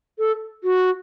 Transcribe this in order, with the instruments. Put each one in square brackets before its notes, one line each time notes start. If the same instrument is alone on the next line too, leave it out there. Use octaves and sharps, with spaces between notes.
[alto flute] A4
F#4